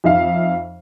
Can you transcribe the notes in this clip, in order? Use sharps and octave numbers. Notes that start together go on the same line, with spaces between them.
F2 D#4 E5 F5